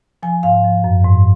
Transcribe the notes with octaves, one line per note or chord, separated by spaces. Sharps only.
F3 G#5
G#2 F5
F3
F#2
G#2